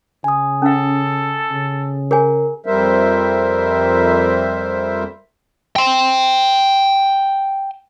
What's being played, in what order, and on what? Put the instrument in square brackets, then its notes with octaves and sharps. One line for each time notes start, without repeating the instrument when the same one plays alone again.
[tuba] C#3 [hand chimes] G#5 D#6
[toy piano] C#4 F5 [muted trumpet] A4
[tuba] C#3
[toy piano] G#4 C#5 G#5 [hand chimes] A#4
[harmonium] F2 G3 A#4 C5 E5
[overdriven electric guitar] G5 C6